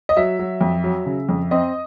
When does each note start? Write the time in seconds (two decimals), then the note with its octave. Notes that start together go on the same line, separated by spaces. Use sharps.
0.09 D#5
0.17 F#3 E5
0.39 F#3
0.61 F2
0.84 F#3
1.06 C#3
1.29 F2
1.51 C4 D#5